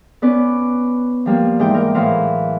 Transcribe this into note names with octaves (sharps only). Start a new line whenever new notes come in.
B3 C#4 B4 D5
F3 G3 A#3
G#2 E3 D#4 D5 G5
A#4
A2 E3 F#3 A#4 C5 F5